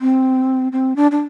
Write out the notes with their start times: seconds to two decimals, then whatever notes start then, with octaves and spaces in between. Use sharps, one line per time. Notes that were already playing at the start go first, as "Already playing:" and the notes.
0.01 C4
0.72 C4
0.96 D4
1.11 D4